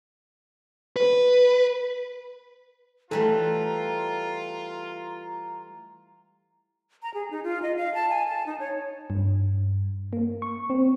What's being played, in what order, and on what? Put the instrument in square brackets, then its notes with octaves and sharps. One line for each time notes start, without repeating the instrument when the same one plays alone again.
[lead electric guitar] B4
[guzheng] E3 G3 A3 [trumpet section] F4 [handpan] A4 [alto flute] A#5
[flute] A#5
G#4
D#4
F4
D#5
F5
A5
G#5
A5
D#4
C#5
[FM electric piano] G2
A#3
C#6
C4